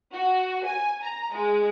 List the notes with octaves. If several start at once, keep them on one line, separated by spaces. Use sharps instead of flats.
F#4
G#5
A#5
G#3